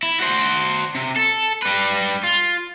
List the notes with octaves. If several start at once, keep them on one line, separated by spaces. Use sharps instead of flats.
E4
F#4 C5
C3
A4
G3 B4
F4